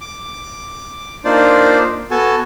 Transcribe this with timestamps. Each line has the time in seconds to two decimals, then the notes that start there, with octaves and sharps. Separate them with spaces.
0.01 D6
1.25 A#3 D4 D#4 F4 C5 D5
2.11 B3 F#4 A4 G#5 A5